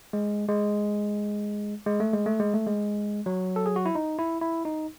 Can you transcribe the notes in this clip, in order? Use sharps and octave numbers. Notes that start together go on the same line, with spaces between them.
G#3
G#3
G#3
A3
G#3
A3
G#3
A3
G#3
F#3
A4
G#4
F#4
E4
D#4
E4
E4
D#4